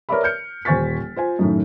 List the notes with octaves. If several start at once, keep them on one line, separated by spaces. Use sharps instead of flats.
A#4 B4 C#5 D5 E5 B5
F6 G6 C#7
D#1 C5 G#5 C#6 A6 B6
F4 C5 G#5
F#2 A2 D#3